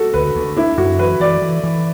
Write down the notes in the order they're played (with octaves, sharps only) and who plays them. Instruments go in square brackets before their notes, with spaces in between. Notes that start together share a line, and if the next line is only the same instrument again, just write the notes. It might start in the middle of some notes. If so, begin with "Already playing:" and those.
Already playing: [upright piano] F#4 A4
[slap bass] D2 [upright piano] B4
[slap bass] D2
[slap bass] D4 [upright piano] E4
[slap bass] F#2 [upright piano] F#4
[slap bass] E3 [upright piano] B4
[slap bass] E3 [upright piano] D5
[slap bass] E3
E3